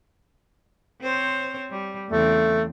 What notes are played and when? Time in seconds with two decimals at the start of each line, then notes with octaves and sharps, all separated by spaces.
1.01 C4 C5 C#5
1.71 G3
2.09 E2 C#3 A3 C4